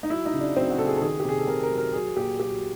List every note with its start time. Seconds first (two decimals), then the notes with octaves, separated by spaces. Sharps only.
0.03 D#4
0.10 F#3 E4
0.26 D#4
0.33 C#3
0.41 D4
0.56 F#3 C4
0.71 F#4
0.78 C#3 A4
0.86 G#4
0.97 A4
1.01 D#3 G#4
1.20 G4
1.25 C3 G#4
1.39 A4
1.47 C3 A#4
1.63 A#4
1.70 F#3
1.78 A#4
1.93 F#3 G#4
2.16 A#2 G4
2.39 F#3 G4